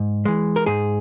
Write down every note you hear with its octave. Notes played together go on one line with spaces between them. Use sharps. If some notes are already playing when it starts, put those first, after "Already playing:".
Already playing: G#2
E3 G#3
A#4
G#2 G#4